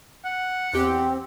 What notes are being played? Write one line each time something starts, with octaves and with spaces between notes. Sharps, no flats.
F#5
E2 C4 G4